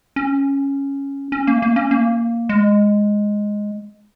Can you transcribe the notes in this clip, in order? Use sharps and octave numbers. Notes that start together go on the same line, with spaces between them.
C#4
C#4
A#3
A#3
C#4
A#3
G#3